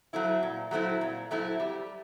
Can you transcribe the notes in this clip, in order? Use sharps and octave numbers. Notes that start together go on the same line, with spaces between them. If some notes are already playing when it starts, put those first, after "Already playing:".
F#3 A3 C4 E4
A#2
F#3 A3 C4 E4
A#2
F#3 A3 C4 E4
G3